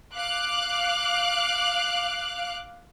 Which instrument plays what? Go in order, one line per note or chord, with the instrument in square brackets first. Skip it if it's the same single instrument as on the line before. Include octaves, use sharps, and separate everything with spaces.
[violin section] F5 D6 F#6